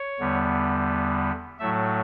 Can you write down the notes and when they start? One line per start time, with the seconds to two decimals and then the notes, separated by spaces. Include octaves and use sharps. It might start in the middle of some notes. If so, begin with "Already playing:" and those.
Already playing: C#5
0.20 E2 D3 G3 B3
1.59 A2 F#3 A3 E5